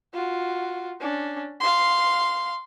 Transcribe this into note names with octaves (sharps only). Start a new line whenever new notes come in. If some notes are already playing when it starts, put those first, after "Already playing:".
F4 F#4
C#4 D4
F5 C6